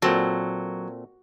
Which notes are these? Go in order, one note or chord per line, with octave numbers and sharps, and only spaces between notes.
A#2 F#3 C4 A4